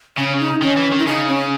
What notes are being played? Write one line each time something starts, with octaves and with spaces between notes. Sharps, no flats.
C#3 C#4
D#4
D#3 C#4
E3
D#3
E4
C#3 D#4
C#4